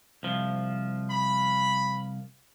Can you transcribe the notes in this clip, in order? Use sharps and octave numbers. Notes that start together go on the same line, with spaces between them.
C2 F3
B5